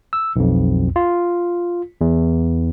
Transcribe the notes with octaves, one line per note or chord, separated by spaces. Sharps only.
E6
B1 F2
F4
E2